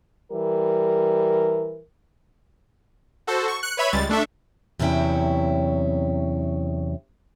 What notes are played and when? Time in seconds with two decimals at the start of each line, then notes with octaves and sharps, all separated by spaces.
0.31 E3 G3 A#4
3.27 F#4 A4 C5
3.48 C#6
3.63 F#6 C#7
3.77 B4 C#5 E5 B5
3.93 C#2 G3 G#3 A6
4.09 A3 D4 A4 E5
4.79 E2 C3 F#3 C#4 E4 G5